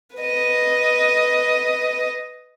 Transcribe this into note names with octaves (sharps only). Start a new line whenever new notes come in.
B4 D#5